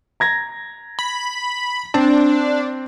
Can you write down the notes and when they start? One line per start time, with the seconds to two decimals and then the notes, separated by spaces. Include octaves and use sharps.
0.20 A#5 G#6 A#6
0.99 B5
1.94 C4 D4